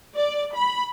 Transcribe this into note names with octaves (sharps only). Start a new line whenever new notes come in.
D5
B5